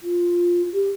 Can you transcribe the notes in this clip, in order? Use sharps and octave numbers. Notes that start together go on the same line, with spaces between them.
F4
G4